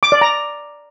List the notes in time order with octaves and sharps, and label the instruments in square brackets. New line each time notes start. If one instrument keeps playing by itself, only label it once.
[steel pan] D6
D5
A#5